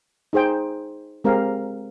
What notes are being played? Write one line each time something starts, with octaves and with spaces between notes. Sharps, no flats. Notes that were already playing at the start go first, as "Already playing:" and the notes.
D#4 G#4 C5 G5
G#3 C4 G4 A#4 F5